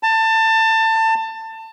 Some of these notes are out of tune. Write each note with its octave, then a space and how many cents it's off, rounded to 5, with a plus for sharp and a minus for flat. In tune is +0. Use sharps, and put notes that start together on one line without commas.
A5 +25